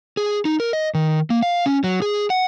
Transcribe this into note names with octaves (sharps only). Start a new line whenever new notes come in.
G#4
D#4
A#4
D#5
D#3
A#3
F5
C#4
F#3
G#4
F#5